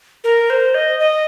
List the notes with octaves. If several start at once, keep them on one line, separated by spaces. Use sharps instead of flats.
A#4
C5
D#5
D#5